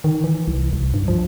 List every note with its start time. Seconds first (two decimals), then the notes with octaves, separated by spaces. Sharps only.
0.04 D#3
0.24 E3
0.48 C2
0.73 C2
0.94 G2
1.08 F3